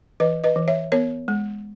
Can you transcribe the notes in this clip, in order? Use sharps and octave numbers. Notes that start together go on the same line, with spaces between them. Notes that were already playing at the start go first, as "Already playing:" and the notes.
E3 B4 D#5
B4 D#5
E3
C#5 E5
B3 A#4 C#5
G#3